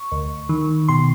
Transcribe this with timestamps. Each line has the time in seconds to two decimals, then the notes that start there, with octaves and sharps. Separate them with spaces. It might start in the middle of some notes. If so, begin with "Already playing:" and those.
Already playing: C#6
0.12 D2
0.49 D#3
0.89 B2 C6